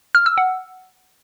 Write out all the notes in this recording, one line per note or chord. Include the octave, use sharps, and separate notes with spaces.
F6
E6
F#5